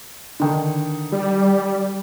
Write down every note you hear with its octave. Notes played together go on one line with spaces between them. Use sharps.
D3 D#3
G3